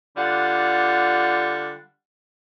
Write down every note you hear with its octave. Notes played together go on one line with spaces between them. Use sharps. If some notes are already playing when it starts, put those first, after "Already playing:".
D3 G3 F4 F#5